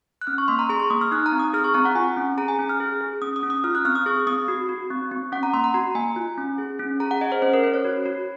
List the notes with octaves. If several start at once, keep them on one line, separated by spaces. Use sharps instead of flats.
F#6
C#4 F6
C#6
A#3 C6
A#5
G#4 C6
C#6
A#3 D#6
F6
D#4 F#6
A#5
C4
D#6
G#4 F6
C#6
C4 A#5
F#5
F4 G#5
C#4
G#4 A#5
G#5
C#4
F6
G#4
G#4
C#4 D#6
D#6
C#4
D#6
F4 F6
F#6
C4 F6
D#6
G#4 C#6
C4 D#6
F#4
F#4
C4
C4
C#4 F#5
A#5
A#3 C6
A#5
F#4 A#5
A#3 G#5
F4
C#4
G#4
C#4
G#4 A#5
F#5
G#4 D#5
C5
C#4 C5
A#4
C#4 C5
C#5
F#4
F#4